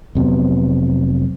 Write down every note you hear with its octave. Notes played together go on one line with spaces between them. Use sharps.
F1 C3 F#3 B3